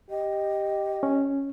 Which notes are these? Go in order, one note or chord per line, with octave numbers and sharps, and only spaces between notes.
G4 D#5
C#4